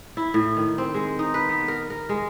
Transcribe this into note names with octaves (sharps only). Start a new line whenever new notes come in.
E4
A2
D#3
C4
G#3
D#4
B4
B3
A#4
A#4
G#3